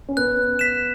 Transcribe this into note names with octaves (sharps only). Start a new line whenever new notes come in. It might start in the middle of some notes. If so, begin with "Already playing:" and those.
C#4
B3 F#6
B6 E7